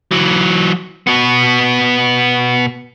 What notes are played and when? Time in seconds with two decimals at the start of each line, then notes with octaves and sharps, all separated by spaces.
0.11 E3 F#3
1.07 B2 B3